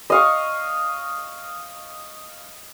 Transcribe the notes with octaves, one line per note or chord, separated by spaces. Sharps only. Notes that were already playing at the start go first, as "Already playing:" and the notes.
D#5 F5 C#6